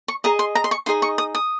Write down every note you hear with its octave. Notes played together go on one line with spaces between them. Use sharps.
C#6
G#4 D#5 A#5
C6
A#5
C6
C#6
D#4 G#4 D#5 C6
C#6
D#6
D#6